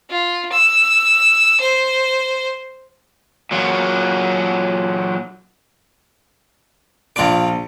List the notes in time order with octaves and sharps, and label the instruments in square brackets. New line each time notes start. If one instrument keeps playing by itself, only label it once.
[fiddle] F4
E6
C5
[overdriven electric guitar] A#2 F#3
[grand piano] A#1 D7 [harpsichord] F4 D5